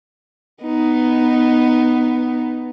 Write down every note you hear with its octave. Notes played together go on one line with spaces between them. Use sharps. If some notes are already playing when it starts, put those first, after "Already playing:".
B3 D#4